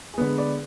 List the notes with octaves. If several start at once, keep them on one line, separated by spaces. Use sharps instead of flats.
G#4
D3 G#3 B3 B4
B4 D5